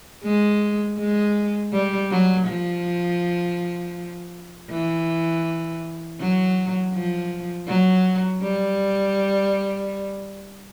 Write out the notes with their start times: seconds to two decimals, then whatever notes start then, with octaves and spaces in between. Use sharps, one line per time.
0.24 G#3
0.98 G#3
1.73 G3
2.11 F#3
2.48 F3
4.70 E3
6.20 F#3
6.93 F3
7.68 F#3
8.42 G3